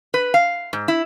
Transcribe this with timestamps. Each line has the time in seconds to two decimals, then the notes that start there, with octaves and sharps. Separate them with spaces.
0.14 B4
0.34 F5
0.73 G#2
0.88 E4